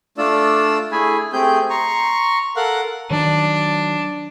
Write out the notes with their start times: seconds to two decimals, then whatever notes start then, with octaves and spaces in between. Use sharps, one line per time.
0.18 A3 D4 F4 D5 E6
0.92 A3 E4 G#4 G#5 B5
1.33 A3 C4 G4 G#4 G6
1.70 A#5 C6 C#6
2.56 A4 A#4 F5 F#5 F#6
3.11 D#3 F#3 D4